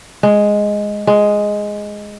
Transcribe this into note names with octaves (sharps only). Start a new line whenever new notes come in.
G#3
G#3